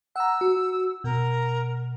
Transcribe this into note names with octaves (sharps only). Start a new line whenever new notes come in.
F#5 A#5 E6
F#4
B2 A#4